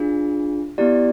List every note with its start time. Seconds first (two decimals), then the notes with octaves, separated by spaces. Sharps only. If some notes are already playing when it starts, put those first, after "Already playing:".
Already playing: D4 F4 G#4
0.78 B3 E4 G4 D5